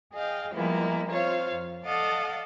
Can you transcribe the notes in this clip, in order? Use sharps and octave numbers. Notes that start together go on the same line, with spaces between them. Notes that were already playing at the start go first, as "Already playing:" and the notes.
G#4 D#5 F5 G5
F3 G3 G#3 A#3 B3 E4
C4 F4 C#5 F5
F2
A4 D5 D#5 F5 F#5 A5